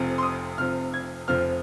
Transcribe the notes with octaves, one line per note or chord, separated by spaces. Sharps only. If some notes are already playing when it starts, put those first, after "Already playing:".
Already playing: F1 F2 C3 F3
C6
D#6
F1 F2 C3 F3 F6
G#6
F1 F2 F3 C4 F6